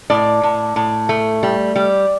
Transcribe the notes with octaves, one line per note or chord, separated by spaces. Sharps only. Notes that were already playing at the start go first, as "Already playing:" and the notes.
A2 D5
A2
A2
A3
G3
G3